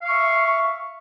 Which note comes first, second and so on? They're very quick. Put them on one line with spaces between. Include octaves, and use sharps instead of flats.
F5 C#6 E5